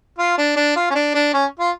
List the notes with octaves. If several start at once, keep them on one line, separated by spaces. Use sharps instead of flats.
F4
D4
D4
F4
C#4
D4
D4
C#4
F4